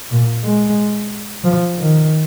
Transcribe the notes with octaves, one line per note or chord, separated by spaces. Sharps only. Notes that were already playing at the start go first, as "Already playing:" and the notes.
A#2
G#3
F3
D#3